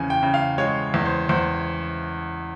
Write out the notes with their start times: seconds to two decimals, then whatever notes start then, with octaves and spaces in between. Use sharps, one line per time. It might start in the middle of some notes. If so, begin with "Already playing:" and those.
Already playing: E2 C#3 G#5
0.10 G5
0.23 C#3
0.34 F5
0.58 G#3 C#5
0.94 E2
1.06 C5
1.29 E2 C5